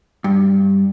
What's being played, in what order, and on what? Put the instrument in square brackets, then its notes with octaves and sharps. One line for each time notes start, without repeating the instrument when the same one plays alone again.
[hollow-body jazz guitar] G2